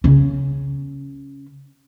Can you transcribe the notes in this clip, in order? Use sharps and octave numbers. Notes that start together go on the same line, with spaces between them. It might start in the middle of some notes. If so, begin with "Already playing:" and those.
C#3 C#4